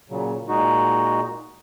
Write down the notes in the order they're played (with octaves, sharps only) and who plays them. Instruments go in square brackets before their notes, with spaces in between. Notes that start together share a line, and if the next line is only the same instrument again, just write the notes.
[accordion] A#2 C#3 F#3
A#2 G#3 D#4 F#4